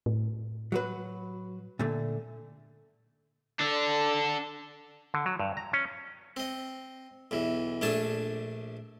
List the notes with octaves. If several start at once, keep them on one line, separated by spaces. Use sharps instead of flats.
A2
F#3 F#4 B4
A#2 D3 A3
D4 A4
D3
F#3
G2
A#5
C#4
C4 D#5
B1 E2 E3
A#1 A3 D4 G#5 A5